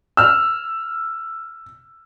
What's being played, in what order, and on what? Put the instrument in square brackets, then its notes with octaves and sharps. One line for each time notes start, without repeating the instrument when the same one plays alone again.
[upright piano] E6 F6